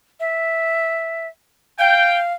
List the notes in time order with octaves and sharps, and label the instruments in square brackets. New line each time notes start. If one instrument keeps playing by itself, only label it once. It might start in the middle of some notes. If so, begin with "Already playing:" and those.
[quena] E5
[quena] F5 [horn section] G5